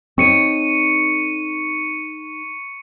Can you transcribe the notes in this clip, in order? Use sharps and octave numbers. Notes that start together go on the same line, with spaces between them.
C4 D#4 A4 C#5 C#6 C#7 D#7